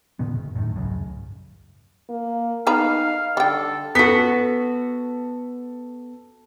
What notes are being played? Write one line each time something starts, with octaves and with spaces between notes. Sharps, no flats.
A#2 D3 D#3 B3
F#1
F#2 A2 D#3
G#1 C#2 F#2
A#3
B3 D#4 B4 F5 A#5
D3 G3 A4 G5
B3 F#4 A4 B6